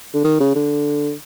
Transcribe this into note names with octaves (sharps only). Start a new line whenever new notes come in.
D3
D#3
C#3
D3